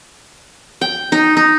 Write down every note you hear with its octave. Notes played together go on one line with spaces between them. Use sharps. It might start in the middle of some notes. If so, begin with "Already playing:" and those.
G5
D#4
D#4